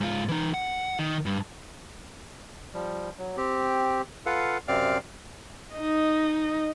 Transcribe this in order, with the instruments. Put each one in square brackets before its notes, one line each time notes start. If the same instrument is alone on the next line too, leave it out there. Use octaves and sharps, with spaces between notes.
[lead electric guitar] G#2 F4
E3 D#4
F#5
D#3
G2
[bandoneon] F3 G3
F#3
C4 G4
F4 A4 B4 F5 F#5
F#2 C3 C4 D5 F5 F6
[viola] D#4 D#5